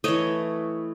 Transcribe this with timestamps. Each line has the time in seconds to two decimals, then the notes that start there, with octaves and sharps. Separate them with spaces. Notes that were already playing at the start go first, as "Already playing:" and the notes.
0.04 E3 A3 C#5 D#5